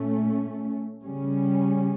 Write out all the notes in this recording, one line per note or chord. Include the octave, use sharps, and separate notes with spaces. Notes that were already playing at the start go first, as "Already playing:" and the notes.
Already playing: A#2 A3 C#4
C#3 G3 C#4